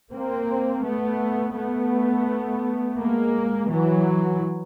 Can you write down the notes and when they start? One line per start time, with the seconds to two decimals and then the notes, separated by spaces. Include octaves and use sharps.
0.12 A#3 C4
0.84 A3 B3
1.55 A3 B3
2.99 G#3 A#3
3.70 E3 F#3